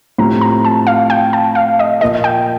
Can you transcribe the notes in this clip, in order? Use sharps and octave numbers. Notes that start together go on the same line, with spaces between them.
A2 F3 C4 G4 A#5
A#5
A5
F5
G5
A5
F5
D#5
A#2 F3 A#3 D#5
G5